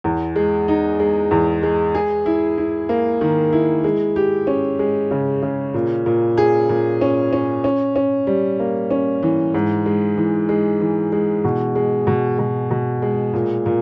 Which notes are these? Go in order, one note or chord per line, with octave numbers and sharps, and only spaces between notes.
E2
G#3
D#4
G#3
E2
G#3
G#4
E4
E4
A#3
D#3
E4
G#3
G4
C#4
G#3
C#3
C#3
A#2
A#2
G#4
A#2
C#4
C#4
C#4
C#4
G3
A#3
C#4
E3
G#2
G#3
E3
G#3
E3
G#3
B2
G#3
B2
B2
B2
G#3
A#2
A#2